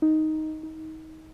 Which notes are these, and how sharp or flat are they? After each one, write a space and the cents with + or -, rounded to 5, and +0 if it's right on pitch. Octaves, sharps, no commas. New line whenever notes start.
D#4 +5
D#4 +25